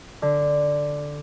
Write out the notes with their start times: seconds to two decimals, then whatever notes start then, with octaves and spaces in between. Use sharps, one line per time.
0.22 D3